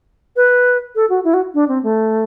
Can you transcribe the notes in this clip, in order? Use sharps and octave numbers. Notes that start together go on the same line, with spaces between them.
B4
A4
F#4
E4
F#4
D4
C4
A3